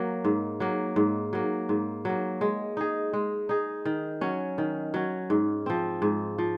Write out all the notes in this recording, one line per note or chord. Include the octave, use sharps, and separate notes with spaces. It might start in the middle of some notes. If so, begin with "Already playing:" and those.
Already playing: F#3 A#3
G#2
F#3 A#3
G#2
F#3 A#3
G#2
F#3 A#3
G#3
D#4 G#4
G#3
D#4 G#4
D#3
F#3 C#4
D#3
F#3 C#4
G#2
F3 C4
G#2
F3